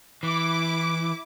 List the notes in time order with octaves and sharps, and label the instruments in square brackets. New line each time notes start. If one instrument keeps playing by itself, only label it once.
[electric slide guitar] E3 [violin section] E4 D6